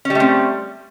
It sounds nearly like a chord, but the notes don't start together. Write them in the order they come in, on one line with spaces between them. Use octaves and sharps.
C#4 G3 A3 C4